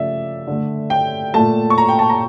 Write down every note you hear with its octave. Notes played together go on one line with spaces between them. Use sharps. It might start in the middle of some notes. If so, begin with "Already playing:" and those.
Already playing: C#3 F3 A3 D5 E5
D3 A3
G5
A#2 A3 A5
C#6
A#5
G5
A5
A#5